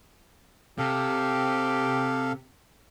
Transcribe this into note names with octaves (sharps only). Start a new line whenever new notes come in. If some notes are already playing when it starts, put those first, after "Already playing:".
C3 G4 A4 F5